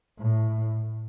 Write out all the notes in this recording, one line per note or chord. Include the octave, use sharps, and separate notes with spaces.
A2